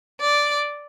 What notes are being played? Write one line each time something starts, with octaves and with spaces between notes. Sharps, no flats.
D5